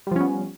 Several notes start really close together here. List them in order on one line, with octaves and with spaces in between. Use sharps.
G3 F3 C#4 B3